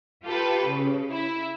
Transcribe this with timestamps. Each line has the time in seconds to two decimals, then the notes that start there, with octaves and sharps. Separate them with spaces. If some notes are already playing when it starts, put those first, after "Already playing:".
0.24 F4 G4 A4 B4
0.66 C#3
1.10 E4